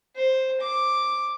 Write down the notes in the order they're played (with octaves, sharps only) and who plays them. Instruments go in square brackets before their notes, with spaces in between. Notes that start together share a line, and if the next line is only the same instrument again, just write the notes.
[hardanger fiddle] C5
D6